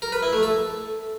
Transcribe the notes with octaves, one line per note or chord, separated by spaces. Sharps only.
A#4
B4
E4
A3
A4